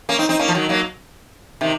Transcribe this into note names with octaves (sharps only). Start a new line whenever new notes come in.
A#3 C#4
C4 D#4
C4 D#4
A#3 C#4
F3
D#3 F#3
F#3 A#3
C3 D#3